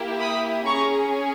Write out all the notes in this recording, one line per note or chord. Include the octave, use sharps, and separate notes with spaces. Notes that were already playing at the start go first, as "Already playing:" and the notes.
Already playing: A#3 E4 G4
B5 D#6
C#4 G#4 A#5 C#6